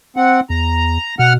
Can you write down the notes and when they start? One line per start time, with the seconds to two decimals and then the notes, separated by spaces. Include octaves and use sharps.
0.17 C4 F#5
0.50 E2 A#5
1.19 B2 F#5 F6